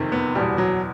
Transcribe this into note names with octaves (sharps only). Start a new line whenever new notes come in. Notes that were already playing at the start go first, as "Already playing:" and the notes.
Already playing: F#1 F2 C3 D#3
B3
F#1 E2 B2 G3
F#3